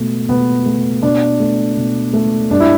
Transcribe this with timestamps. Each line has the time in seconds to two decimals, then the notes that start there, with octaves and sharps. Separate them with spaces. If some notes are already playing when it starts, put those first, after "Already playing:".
Already playing: B2 A3
0.29 B2 B3
0.66 A3
1.03 B2 D4
1.40 A3
1.77 B2
2.13 A3
2.51 G2 D4
2.60 E4